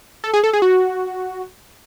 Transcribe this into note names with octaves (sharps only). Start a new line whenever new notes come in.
A4
G#4
A4
G#4
F#4